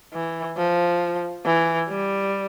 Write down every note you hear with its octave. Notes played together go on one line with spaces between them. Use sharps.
E3
F3
E3
G3